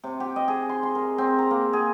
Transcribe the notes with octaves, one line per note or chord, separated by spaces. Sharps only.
C3
G4
D#5
G#4
C6
C6
A#4
C4
A#5
A#3
G#4